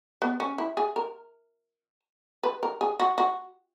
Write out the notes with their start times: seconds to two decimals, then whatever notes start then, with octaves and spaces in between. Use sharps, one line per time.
0.22 B3
0.40 C#4
0.58 E4
0.77 G#4
0.96 A#4
2.43 B4
2.63 A#4
2.81 G#4
3.00 F#4
3.18 F#4